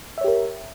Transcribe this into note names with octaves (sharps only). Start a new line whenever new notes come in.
G4 A#4 C#5 E5